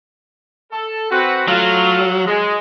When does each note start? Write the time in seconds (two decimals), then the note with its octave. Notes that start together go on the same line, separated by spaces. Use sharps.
0.72 A4
1.11 C4 F#4 B4
1.48 F#3 A3 F4
2.26 G#3